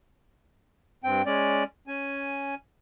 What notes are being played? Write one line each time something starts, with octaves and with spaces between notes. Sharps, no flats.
G2 C4 G5
G#3 C#4 D5
C#4 G#5